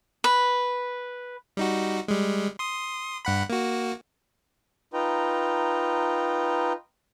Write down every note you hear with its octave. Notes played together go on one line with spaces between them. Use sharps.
B4
G3 D#4 F#4
G3 G#3
C6 D#6
G2 F#5 B5
A#3 F#4
D#4 F4 B4 G5 A#5